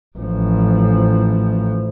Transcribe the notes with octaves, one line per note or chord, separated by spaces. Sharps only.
A1 F3